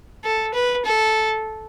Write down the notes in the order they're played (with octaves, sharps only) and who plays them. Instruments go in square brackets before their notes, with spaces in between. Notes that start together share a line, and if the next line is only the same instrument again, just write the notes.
[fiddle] A4
B4
A4